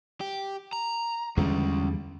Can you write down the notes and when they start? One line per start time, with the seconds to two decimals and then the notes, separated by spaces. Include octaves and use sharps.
0.21 G4
0.73 A#5
1.37 E2 D3 G3 G#3 C#4